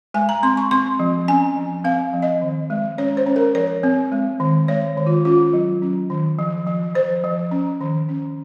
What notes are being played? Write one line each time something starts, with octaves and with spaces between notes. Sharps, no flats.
G#3 G#5
A#5
C4 C6
C#6
C4 C6
F3
C#4 G#5
F3
C4 F5
F3
D#5
D#3
G#3
C#4 C#5
C5
C#4
A#4
F3 C#5
C4
G#3
D#3
G#3 C#5
D#3
F4
C#4 F4
F#3
C#4
D#3
F3
F3
F3 C5
F3
C#4
D#3
C#4